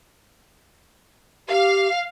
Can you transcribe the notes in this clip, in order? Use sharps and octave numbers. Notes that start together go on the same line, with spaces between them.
G4 F5